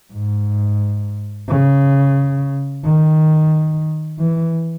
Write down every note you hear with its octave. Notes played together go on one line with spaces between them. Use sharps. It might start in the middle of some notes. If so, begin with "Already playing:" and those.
G#2
C#3
D#3
E3